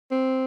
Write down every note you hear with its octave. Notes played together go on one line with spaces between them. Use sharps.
C4